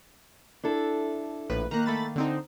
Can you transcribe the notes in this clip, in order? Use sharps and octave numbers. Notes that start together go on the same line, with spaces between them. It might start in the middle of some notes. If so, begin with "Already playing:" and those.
D4 E4 A4
A#1 A2 B4
D#3 A#3 A#5 F#6
A3 B5 A6
D3 C4 D#4